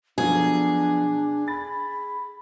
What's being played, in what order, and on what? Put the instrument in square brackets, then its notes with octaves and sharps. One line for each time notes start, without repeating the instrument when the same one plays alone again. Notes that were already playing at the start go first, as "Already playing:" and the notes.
[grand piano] B2 F3 F#3 [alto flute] D4 [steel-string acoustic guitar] G#4
[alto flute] B5 [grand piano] A6